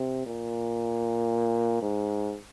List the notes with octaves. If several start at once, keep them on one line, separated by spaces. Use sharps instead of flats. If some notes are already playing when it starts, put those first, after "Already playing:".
Already playing: C3
A#2
G#2